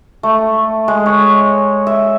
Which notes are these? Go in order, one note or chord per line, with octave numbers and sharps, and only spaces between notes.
A3
G#3
C#5
E5